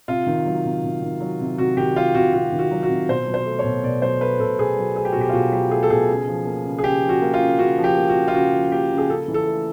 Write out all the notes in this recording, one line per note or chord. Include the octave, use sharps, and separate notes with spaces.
C3 F4
D#3
F#3
C3
C3
D#3
F#3
C3
C3 F#4
D#3 G4
F#3 F4
C3 F#4
C3 F#4
D#3
F#4
F#3
F#4
C3
B2 C5
F#3
C5
A3
C#5
B2
B2 D5
F#3 C5
A3 B4
B2 A4
B2 G#4
F#3
A3 G#4
G4
B2 F#4
G4
F4
B2 F#4
F#3 G4
A3 G#4
A4
B2 G#4
C#3
F3
A#3
C#3
G#4
C#3 G4
F3
F#4
A#3
F4
C#3
C#3 F#4
F3
G4
A#3
F#4
C#3
F4
C#3 F#4
F3
A#3 G4
C#3
G#4
C#3 A4
E3
A4
A3